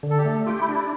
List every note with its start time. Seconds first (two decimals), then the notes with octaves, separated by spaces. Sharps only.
0.03 D3
0.10 A4
0.18 G4
0.25 A3 A4
0.46 F4 G4
0.61 E4
0.68 D4
0.75 E4